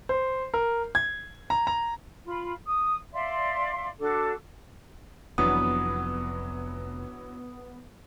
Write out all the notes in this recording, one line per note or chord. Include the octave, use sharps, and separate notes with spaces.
C5
A#4
G#6
A#5
A#5
F4 B5
D#6
D5 E5 F5 C6
D4 F#4 A4 D6
F1 F2 E3 F#3 B3 D4 D#6